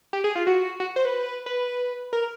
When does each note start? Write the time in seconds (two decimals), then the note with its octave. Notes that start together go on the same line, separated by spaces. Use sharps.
0.13 G4
0.24 G#4
0.35 F4
0.47 F#4
0.80 F#4
0.96 C5
1.05 B4
1.46 B4
2.13 A#4